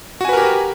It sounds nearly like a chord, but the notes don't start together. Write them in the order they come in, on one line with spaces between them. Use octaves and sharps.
F#4 G#5 B4 A#4 G4